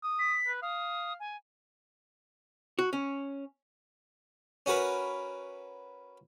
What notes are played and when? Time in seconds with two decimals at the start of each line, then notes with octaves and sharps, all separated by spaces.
0.03 D#6
0.19 B6
0.47 B4
0.62 F5 D#6
1.20 G#5
2.79 F#4
2.93 C#4
4.66 C#4 F#4 A#4 B4